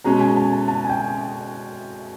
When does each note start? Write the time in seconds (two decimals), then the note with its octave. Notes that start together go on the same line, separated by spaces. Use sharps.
0.04 B2 G#3 C#4 A#5
0.21 G#5
0.37 A5
0.52 A5
0.68 A5
0.85 G#5
0.89 G5